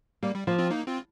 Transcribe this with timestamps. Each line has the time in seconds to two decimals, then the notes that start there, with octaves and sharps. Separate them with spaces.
0.23 G3 A#3
0.35 G3
0.47 F3 A#3
0.58 C4 F4
0.71 A#3 D#4
0.87 C4 F4